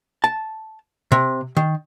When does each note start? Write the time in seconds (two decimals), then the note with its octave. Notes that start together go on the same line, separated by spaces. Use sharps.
0.24 A5
1.12 C3
1.57 D#3